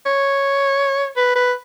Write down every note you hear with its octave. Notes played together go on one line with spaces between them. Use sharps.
C#5
B4
B4